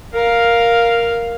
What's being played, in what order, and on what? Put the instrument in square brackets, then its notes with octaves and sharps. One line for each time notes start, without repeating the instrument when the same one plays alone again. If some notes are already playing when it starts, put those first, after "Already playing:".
[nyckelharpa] A#4 F5